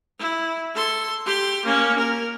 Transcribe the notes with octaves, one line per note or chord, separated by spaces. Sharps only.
E4
A4 C6
G4 C6
A#3 C#4
A#4